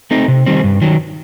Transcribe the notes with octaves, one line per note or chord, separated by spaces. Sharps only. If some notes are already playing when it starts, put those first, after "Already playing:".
A3 C4 D#4
C3
D#3 G3 C4
G2
D#3 F#3